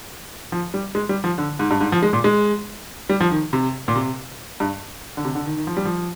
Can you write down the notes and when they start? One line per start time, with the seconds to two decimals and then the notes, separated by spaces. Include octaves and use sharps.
0.52 F3
0.74 G3
0.95 G#3
1.09 G3
1.24 F3
1.38 D3
1.59 G#2
1.71 G2
1.81 G#2
1.92 F3
2.03 G#3
2.13 A#2
2.24 G#3
3.09 G3
3.20 F3
3.31 D#3
3.53 C3
3.88 A#2
3.95 C3
4.60 G2
5.17 D3
5.25 C3
5.35 D3
5.46 D#3
5.57 D#3
5.67 F3
5.77 G3
5.85 F3